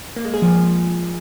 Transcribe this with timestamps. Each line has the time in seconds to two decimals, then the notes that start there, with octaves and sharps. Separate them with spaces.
0.16 A#3
0.25 G#3
0.34 G#4
0.42 F3